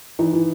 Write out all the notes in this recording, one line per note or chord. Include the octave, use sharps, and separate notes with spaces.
E3 D#4
E3